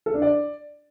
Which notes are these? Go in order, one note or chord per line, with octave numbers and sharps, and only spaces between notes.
A4
D4
D5